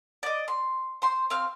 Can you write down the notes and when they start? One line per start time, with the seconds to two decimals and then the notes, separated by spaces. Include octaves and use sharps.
0.23 D5 D#5
0.48 C6
1.02 C5 C6
1.30 C4 F5 C6